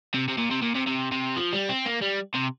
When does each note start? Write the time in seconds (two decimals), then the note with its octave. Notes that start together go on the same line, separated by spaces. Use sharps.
0.14 C3
0.29 C3
0.38 A#2
0.51 C3
0.62 A#2
0.75 C3
0.87 C3
1.12 C3
1.36 F3
1.53 G3
1.69 C4
1.86 A#3
2.01 G3
2.34 C3